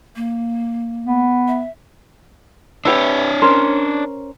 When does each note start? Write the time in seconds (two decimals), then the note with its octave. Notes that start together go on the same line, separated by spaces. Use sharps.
0.16 A#3
1.06 B3
1.48 E5
2.85 D4 G4 B4 C#5 E5
3.42 C#4 A#4 C5